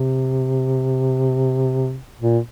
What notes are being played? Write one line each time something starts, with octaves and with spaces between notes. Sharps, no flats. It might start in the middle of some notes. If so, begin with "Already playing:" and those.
Already playing: C3
A#2